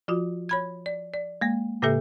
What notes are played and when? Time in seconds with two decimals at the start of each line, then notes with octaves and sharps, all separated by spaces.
0.08 F3 F4 F#4
0.49 C#5 B5 G#6
0.86 D5
1.14 D5
1.41 G#3 A#3
1.82 A2 C#3 A#3 G4 A4 E5